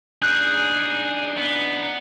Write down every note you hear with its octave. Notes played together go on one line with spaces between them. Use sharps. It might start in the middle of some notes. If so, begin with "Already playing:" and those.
D4 D#4 G#4 F#6 G6
B3